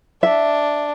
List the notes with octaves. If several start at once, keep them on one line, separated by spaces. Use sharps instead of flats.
D4 E5